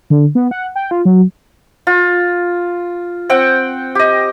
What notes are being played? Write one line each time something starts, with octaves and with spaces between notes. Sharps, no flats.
D3
B3
F#5
G5
F4
F#3
F4
C4 F#5 G5
G4 D#5